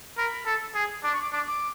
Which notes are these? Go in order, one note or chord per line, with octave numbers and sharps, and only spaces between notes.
A#4 B5
A4
G#4
D4 D6
C#6
D6
D4 D6
D6